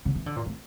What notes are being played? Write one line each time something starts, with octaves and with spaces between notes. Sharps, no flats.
C#3
E3
D3
A#2
A2